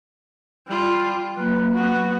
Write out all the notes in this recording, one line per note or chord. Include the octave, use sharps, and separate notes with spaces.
G3 F4
F#3 A#3 B4
B3 F#4